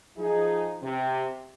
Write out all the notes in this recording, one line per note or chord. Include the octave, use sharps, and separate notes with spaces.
F3 D#4 G#4
C3